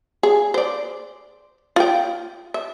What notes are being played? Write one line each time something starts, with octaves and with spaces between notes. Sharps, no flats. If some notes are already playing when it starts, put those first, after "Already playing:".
G#4
C5 D5
F4 G5
E5